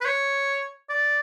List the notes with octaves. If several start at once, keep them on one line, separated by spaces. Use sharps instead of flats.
B4
C#5
D5